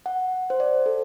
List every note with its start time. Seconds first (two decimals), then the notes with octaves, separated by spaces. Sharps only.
0.06 F#5
0.50 C5
0.60 D5
0.86 A4